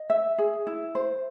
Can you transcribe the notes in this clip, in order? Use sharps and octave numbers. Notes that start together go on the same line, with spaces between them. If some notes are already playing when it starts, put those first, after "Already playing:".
Already playing: D#5
E5
G#4
E4
C5